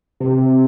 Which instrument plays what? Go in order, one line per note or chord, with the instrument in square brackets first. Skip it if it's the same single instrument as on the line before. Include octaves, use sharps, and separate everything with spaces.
[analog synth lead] C3